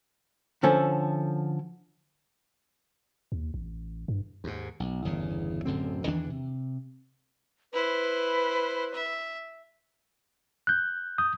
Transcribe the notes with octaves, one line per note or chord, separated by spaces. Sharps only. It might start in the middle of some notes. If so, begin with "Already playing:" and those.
D3 F3 C#4 A4
D#2
A1
G2
D#2 G#2
B1
G1 E2 C#3
D1 F#2 D3 C4
E2 D#3 E3 D4
C3
E4 B4 C5
E5
F#6 G6
D#6 G6